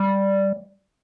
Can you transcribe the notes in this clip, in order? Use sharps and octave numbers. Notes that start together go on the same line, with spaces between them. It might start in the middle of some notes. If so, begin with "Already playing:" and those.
Already playing: G3